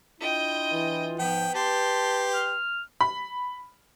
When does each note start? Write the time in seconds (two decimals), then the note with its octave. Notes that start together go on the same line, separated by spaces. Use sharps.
0.20 D4 E4 F4 D#5 G5
0.72 E3
1.19 G#2 F3 B3 G5
1.54 G4 B4 A5 C6
2.34 F6
3.01 B5